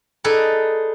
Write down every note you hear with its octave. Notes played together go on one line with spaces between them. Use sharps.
D#4 G#4 A4 B4 D5